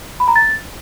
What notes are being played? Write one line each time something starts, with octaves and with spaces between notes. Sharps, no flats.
B5
A#5
A6